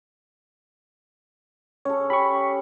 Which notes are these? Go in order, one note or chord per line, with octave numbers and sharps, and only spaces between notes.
C#4 A4 C#5
G4 B5 C#6